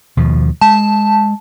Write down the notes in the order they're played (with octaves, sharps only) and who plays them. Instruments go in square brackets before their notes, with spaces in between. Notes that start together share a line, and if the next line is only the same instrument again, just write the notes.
[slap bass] D#2 B2 F3
[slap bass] G#3 [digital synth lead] A5